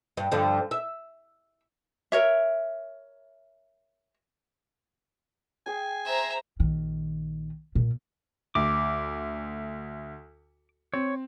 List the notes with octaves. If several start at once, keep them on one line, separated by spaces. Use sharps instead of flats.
G2
G2 D3 F3
E5
A#4 C#5 E5
G#4 G5 G#5
C5 E5 A#5
A#1 D#3
A#2
D2 D6
C4 C#5